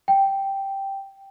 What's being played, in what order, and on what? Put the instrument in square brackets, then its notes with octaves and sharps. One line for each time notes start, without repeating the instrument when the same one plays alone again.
[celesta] G5